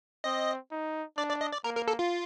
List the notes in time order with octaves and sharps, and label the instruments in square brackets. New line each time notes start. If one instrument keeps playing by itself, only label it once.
[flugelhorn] C4 [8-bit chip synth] D#5
[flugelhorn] D#4
[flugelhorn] D4 [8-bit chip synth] D5
[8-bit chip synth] D5
D#5
D5
[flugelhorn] A#3 [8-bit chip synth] A#4
[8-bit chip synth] A#4
A4
F4